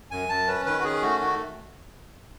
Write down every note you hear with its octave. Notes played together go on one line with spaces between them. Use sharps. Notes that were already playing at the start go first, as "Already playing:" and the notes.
F#2 G#5
F#2 A5
C#4 B4
D#3 B4
F#4
C#4 G#4
A3 F#4
D#3 F#4